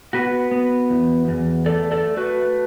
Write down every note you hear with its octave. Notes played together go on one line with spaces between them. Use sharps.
B3 F#4 B4
B3
E2
E2
A3 A4 D5
A4 D5
A3
F#4 B4
A3